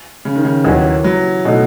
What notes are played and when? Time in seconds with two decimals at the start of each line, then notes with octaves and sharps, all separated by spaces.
0.25 C#3
0.35 D#3
0.45 C#3
0.64 D#2 D#3 E3 F#3 C#4
1.04 F#3
1.45 B2 A3 D#4